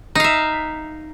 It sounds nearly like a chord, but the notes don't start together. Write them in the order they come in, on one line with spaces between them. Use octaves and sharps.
D#4 F5 E5